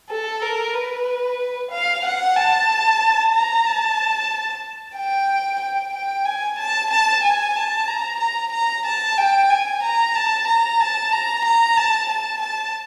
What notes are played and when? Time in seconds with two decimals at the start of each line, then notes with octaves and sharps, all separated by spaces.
0.10 A4
0.42 A#4
0.74 B4
1.71 F5
2.04 F#5
2.36 A5
3.35 A#5
3.66 A5
4.96 G5
5.61 G5
5.94 G5
6.25 G#5
6.58 A5
6.90 A5
7.24 G#5
7.56 A5
7.88 A#5
8.20 A#5
8.52 A#5
8.86 A5
9.18 G5
9.50 G#5
9.83 A#5
10.16 A5
10.48 A#5
10.80 A5
11.13 A#5
11.45 A#5
11.77 A5
12.09 A5
12.42 A5